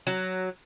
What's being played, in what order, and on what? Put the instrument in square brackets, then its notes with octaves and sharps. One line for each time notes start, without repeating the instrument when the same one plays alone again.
[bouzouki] F#3